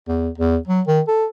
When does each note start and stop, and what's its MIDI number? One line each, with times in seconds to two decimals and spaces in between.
0.08 0.29 40
0.38 0.57 40
0.67 0.81 54
0.87 1.01 51
1.08 1.26 69